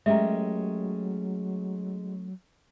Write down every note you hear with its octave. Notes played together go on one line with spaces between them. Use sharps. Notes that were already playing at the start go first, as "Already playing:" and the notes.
F#3 G#3 A3 C#4 G4 A#4 E5